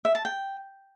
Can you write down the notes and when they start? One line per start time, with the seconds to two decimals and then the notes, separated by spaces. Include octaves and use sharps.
0.05 E5
0.15 A5
0.25 G5